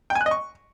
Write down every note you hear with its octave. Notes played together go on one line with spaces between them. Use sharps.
G5
G#5
F#6
D#5
C#6